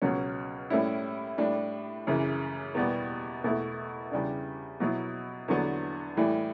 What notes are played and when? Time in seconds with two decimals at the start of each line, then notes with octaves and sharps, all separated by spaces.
0.02 C#2 B2 F#3 C#4
0.70 A2 G3 C#4 E4
1.38 A2 G3 D4
2.07 F#2 C#3 E3
2.75 E2 B2 G3 B3
3.44 E2 B2 A3 E4
4.11 E2 C#3 G3 D4
4.80 B2 F#3 B3 E4
5.48 E2 D3 F#3 B3
6.17 A2 E3 G3